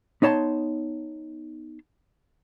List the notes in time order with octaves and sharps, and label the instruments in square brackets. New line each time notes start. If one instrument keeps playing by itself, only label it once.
[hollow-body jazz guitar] B3 D#4 C#5 A5 C6